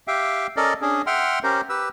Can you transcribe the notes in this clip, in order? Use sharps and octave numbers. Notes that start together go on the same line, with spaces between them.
G4 E5 F5 G5
C#4 A4 A#4 D5 D#5
C#4 D4 G#4
E5 F#5 G5 C6 F6
C#4 G4 A#4 C5
G4 B4 E6